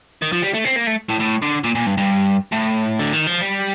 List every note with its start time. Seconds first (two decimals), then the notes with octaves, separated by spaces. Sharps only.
0.22 D#3
0.32 F3
0.42 G3
0.54 A3
0.65 C4
0.76 A#3
0.87 A3
1.09 A2
1.20 A2
1.42 D3
1.64 A#2
1.75 A#2
1.86 G2
1.97 G2
2.52 A2
2.99 D3
3.13 D#3
3.27 F3
3.41 G3